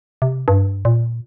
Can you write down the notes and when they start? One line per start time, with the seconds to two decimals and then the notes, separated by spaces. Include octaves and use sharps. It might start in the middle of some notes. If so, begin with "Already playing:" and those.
0.22 C3
0.48 G2
0.85 A#2